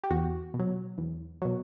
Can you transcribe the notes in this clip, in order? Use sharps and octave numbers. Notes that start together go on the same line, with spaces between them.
G4
E2 F#4
B2
F#3
E2
B2 F#3